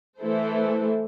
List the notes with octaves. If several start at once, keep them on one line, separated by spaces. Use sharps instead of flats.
E3 A3 E4 A4 C5